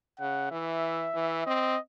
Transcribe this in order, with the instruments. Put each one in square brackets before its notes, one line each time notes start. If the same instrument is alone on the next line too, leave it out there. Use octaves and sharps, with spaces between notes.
[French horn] C#3 [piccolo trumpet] F#5
[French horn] E3 [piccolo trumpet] E5
[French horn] E3
[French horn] C4 [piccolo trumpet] D#5